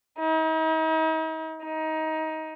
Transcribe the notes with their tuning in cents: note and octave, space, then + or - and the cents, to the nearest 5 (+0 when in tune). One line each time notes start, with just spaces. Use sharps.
D#4 +40
D#4 +20